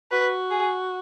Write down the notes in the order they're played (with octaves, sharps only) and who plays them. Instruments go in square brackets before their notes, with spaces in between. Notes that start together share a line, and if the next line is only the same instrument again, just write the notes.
[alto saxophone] F#4 [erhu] B4
[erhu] G#4